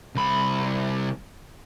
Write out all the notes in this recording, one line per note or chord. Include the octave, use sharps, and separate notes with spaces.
C2 B5